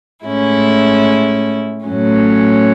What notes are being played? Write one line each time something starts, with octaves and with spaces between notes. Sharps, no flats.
A2 G#3 C#4 E4
A2 F#3 C#4